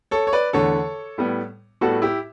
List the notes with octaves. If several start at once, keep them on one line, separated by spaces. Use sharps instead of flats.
A4 C#5
C#5
B4 D5
E2 D3 A3 A4 C#5
A2 G3 B3
A2 G3 B3 F#4 A4
E4 G4